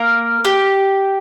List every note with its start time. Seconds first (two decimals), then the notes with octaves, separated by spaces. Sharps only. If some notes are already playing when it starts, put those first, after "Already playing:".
Already playing: A#3 A#4
0.45 G4